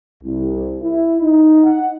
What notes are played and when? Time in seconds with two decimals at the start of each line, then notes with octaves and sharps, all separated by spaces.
0.24 C2
0.82 E4
1.21 D#4
1.64 F#5